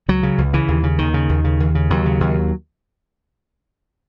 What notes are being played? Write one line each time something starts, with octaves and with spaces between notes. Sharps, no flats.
C#2 F#3
C#3
C#2
C#3 E3
D#2
C#3
D#2 D#3
C#3
D#2
C#3
D#2
C#3
D#2 F#3
C#3
D#2